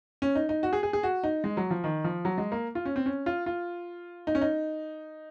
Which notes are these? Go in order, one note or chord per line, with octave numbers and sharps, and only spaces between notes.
C#4
D#4
D#4
F#4
G#4
G#4
G#4
F#4
D#4
G#3
F#3
F3
D#3
F3
F#3
G#3
A#3
F4
C#4
C4
C#4
F4
F4
D#4
C#4
D#4